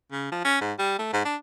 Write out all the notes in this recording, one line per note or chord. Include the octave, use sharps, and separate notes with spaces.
C#3
F3
C#4
G#2
G3
A3
G#2
D4